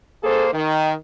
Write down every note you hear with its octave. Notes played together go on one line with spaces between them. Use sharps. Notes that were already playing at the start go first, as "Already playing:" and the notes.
A#3 G#4 A4 C5
D#3